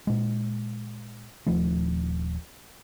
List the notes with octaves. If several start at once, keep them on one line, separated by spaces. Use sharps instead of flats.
A#2 G#3
D#1 F3 A3